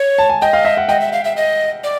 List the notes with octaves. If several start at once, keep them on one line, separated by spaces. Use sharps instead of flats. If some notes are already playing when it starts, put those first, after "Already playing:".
Already playing: C#5
A5
G#5
D#5 G5
F5
E5
F#5
D#5 G5
E5
F5
E5
D#5
D5